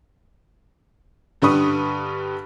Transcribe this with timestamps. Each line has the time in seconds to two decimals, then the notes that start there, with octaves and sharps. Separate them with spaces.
1.42 G2 D3 G3 B4 C#6 D#6